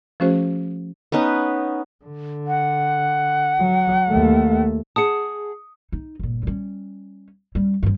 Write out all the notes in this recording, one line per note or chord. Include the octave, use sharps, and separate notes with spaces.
F3 A3 C#4 F#4 G#4 C5
B3 C#4 D#4 B4
D3
F#5
F#3
D#2 A3
G#4 F#5 A5 D#6 C#7
D#4
G1 A#2
G3 C#4
G3 C#4
G2 F3